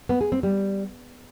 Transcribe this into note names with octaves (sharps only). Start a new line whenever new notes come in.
B3
G#4
C4
G3